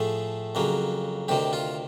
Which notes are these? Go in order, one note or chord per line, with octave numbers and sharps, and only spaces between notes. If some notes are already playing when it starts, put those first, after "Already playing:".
Already playing: A2 F3 A3 G#4
F2 C#3 F#3 A#3
D2 C3 D#3 G4
F4